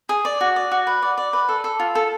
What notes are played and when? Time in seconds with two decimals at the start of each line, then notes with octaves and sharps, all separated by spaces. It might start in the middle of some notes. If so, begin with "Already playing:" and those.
0.09 G#4
0.25 D5
0.41 F#4
0.56 D5
0.71 F#4
0.87 B4
1.02 D5
1.18 D5
1.33 B4
1.49 A4
1.64 A4
1.80 F4
1.95 A4